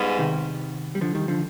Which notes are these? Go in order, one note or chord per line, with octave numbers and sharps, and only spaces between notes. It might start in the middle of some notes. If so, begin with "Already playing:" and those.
Already playing: G#2 G3 B3 F4 G#4
C3 D#3
G3
D3 F3
D#3 G3
D3 F3